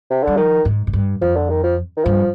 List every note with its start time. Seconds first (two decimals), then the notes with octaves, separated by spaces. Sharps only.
0.10 C3
0.24 D3 G3
0.37 D#3 F3
0.65 G#2
0.87 G#2
0.93 G2
1.22 F2 F3
1.36 D3
1.50 D#3
1.63 F3
1.97 D#3
2.05 G2 F3